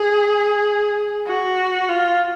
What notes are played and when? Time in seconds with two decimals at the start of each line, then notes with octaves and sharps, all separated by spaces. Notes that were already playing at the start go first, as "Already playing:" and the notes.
Already playing: G#4
1.27 F#4
1.89 F4